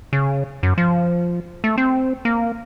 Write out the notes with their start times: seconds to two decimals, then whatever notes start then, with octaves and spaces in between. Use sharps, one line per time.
0.13 C#3
0.63 F#2
0.78 F3
1.64 A3
1.78 C4
2.25 A#3